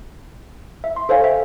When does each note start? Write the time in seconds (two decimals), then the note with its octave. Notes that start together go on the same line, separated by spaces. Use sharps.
0.84 E5
0.96 C6
1.09 A4 C5 C#5 F5 G#5
1.24 E5 G5